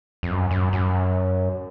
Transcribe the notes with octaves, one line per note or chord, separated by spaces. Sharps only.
F2
F#2
F#2
F#2